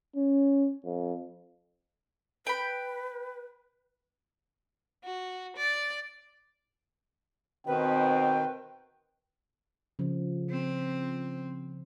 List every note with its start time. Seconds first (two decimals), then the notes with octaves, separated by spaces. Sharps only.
0.16 C#4
0.85 F2
2.47 B4 G5 B5
5.04 F#4
5.56 D5
7.67 B2 D#3 C4 B4 G5
9.99 C#3 F3
10.50 C4